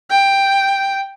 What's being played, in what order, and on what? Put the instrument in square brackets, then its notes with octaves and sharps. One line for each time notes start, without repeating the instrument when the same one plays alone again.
[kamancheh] G5